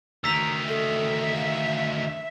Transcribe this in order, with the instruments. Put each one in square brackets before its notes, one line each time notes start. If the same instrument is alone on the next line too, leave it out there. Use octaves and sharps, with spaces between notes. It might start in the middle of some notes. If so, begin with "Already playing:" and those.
[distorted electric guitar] D2 D#3 [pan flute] A#5 [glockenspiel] E6 B6 F7
[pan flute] A4 [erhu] E5
[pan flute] F5